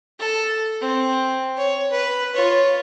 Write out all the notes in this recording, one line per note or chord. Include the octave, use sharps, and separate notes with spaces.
A4
C4
C#5
B4
F4 C#5